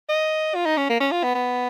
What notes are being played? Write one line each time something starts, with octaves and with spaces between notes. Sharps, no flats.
D#5
F4
D#4
C#4
A#3
C#4
F4
B3
B3